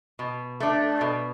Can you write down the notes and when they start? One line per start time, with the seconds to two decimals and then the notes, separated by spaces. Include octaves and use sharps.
0.19 B2
0.60 A3 D4
1.01 B2